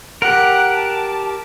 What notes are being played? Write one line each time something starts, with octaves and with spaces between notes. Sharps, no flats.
G4 A#4 F#5
A5